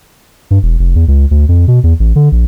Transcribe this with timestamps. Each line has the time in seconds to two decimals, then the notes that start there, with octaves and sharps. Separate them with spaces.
0.51 G2
0.63 E1
0.79 F1
0.95 E2
1.08 C#2
1.31 D2
1.49 F2
1.68 B2
1.83 E2
2.00 A1
2.16 D3
2.32 A#1